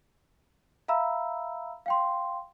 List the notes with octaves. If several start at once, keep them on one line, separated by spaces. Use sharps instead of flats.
E5 F5 A#5 B5 E6
F5 G5 C6